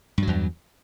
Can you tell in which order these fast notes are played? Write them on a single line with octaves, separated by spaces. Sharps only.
G2 F#3 E2